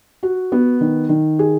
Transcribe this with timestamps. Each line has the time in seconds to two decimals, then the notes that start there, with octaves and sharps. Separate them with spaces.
0.23 F#4
0.52 B3
0.81 D#3
1.09 D#3
1.39 G#4